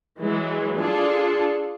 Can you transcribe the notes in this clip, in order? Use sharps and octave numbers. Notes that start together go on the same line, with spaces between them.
E3 F#3 G#3
D4 F4 G#4 A4